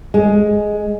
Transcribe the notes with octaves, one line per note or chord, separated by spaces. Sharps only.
G#3